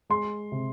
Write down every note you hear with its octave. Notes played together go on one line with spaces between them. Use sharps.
G#3 C6
C3